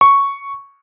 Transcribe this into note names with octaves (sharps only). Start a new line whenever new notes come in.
C#6